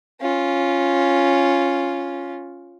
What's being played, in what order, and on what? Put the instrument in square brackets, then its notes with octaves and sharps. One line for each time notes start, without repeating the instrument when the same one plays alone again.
[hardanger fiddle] C#4 F4